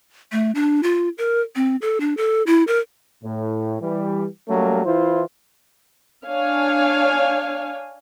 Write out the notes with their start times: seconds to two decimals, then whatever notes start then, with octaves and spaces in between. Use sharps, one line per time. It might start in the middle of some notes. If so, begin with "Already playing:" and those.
0.32 A3
0.55 D4
0.83 F4
1.18 A#4
1.56 C4
1.82 A4
2.00 D4
2.17 A4
2.47 E4
2.67 A#4
3.24 A2
3.81 E3 G3
4.49 F#3 G3 A3 A#3 C#4
4.85 E3 E4 F4 C5
6.26 D4 C#5 F5 G#5